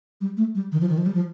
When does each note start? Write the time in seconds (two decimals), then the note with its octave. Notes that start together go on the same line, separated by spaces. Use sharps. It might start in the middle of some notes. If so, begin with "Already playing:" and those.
0.21 G3
0.37 A3
0.55 G3
0.72 D#3
0.81 F3
0.89 D#3
0.98 F3
1.06 G3
1.15 F3